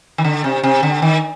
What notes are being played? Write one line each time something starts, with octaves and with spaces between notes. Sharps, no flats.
D#3
D3
C3
C3
D3
D#3